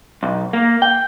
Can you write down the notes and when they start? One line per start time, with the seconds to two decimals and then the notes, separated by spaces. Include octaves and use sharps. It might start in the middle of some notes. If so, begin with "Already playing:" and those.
0.23 B1
0.53 A#3
0.82 G5